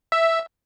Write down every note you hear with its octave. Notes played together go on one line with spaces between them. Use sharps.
E5